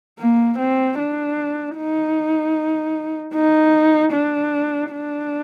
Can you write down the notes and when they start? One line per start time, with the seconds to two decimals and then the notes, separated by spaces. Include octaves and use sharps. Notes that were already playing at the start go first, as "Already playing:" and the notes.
0.19 A#3
0.58 C4
0.98 D4
1.76 D#4
3.34 D#4
4.12 D4
4.92 D4